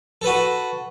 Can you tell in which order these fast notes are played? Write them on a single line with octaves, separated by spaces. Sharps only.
A4 B4 F#4